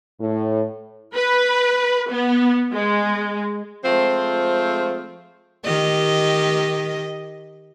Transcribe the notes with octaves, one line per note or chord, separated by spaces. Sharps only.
A2
B4
B3
G#3
F3 G#3 A3 C4
D#3 G4 D#5